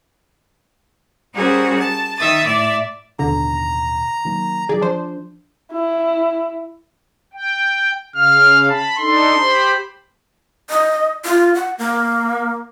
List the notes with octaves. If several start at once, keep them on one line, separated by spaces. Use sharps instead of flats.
G3 C#4 F#4 G#4 A#4 C5
A5
D#3 E5 D#6 A6
A2 D5 E5
A1 D#2 B2 D3 A#5
D#3 F#3 A#3
D#3 F#3 G#4 D5
F3 D4 C5
E4
G5
C#3 F5 F6
A5 B5
D4 D#4 A4 C6
G4 C5 B5
D#5
F4
F#5
A#3